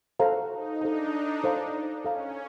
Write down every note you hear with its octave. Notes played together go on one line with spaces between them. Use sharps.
F#4 A4 C5 F5 A#5
D#4
D4 A4 C5 F5 A#5
A4 C5 F5 A#5
C#4 A4 C5 F5 A#5